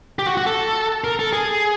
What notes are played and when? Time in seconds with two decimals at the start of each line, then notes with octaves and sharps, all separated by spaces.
0.19 G4
0.27 F#4
0.37 F#4
0.46 A4
1.04 A#4
1.19 A4
1.33 G#4